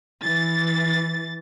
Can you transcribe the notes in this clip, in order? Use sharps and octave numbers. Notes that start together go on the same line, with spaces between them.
E3 A6